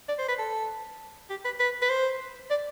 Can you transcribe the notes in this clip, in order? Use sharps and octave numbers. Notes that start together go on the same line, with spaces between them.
D5
C5
B4
A4
G4
B4
B4
B4
C5
D5